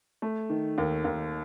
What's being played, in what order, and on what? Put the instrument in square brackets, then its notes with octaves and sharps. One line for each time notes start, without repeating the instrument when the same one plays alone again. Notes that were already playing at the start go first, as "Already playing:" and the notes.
[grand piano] A3
D#3
D#2
D#2